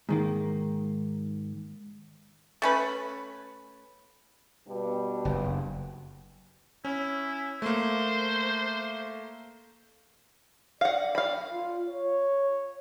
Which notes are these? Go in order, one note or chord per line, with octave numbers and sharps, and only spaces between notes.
G#2 D#3 A#3
A3 C#4 B4
G2 B2
F#1
C#4 E4
A3 A#3 C5
D5 F5 F#5
F5 B5
F4
C#5